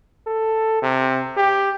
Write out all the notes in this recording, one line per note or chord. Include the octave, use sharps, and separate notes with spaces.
A4
C3
G4